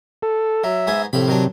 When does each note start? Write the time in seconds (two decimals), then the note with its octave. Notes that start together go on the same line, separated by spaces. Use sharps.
0.23 A4
0.64 F#3 E5
0.87 G#2 B3 G#5
1.13 A2 C3 F3 B5
1.27 D#3 F#3 D4